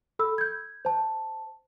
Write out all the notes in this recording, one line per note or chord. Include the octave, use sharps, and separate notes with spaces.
A4 B5 E6
G6 G#6
C5 A5